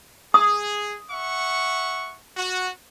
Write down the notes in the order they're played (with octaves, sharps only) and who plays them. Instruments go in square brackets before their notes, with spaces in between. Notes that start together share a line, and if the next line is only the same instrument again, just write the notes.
[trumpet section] G#4 [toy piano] D#6
[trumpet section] E5 F#5 C#6
F#4